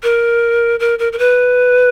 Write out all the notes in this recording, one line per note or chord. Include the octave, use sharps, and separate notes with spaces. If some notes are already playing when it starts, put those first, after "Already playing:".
A#4
A#4
A#4
A#4
B4